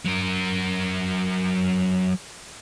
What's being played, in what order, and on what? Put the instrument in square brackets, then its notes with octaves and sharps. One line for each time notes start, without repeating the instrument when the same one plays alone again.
[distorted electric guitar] F#3 A#4